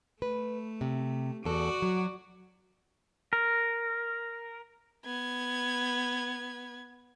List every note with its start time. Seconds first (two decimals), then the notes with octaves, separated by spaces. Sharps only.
0.22 A3 B4
0.81 C3
1.45 E2 F#4 A4 D5
1.82 F#3
3.33 A#4
5.05 B3 G#6